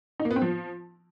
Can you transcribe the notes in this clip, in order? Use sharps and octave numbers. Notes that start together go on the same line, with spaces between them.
D#4
A#3
B3
C4
F3